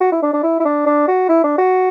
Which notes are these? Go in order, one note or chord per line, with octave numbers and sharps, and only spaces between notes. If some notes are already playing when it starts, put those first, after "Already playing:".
F#4
E4
D4
D4
E4
E4
D4
D4
F#4
E4
D4
F#4